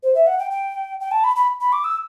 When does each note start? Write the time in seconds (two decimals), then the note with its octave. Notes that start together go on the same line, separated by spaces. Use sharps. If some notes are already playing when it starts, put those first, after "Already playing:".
0.03 C5
0.15 E5
0.27 F#5
0.39 G5
0.51 G5
1.00 G5
1.11 A5
1.24 B5
1.36 B5
1.61 B5
1.73 D6
1.84 E6